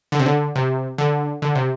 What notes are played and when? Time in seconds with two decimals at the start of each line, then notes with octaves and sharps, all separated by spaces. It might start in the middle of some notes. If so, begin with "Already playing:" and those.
0.12 D3
0.20 C3
0.26 D3
0.55 C3
0.98 D3
1.42 D3
1.55 C3